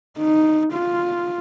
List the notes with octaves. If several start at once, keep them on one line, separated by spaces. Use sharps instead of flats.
D#4
F4